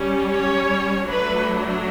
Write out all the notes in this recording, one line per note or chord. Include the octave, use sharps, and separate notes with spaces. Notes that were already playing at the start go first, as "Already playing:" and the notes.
Already playing: G3 C#4
C#5
F#3 A3 D4 B4